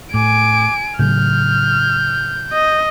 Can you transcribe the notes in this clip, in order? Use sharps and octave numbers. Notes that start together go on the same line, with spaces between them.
A2 G#5 D6 D7
A2 C#3 F#3 F6 G6
D#5